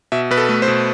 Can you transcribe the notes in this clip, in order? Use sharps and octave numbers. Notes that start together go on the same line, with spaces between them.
B2 E5
B2 B4
A4
A3
C5
B2